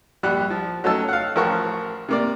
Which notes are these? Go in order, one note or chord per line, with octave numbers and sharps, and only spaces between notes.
A#1 G3 G4 F#5 F#6
F3
F#3 A3 C#4 D#4 A5 E6
F5 F#5
A1 F3 A#4 F#5 C#6
C3 A#3 D5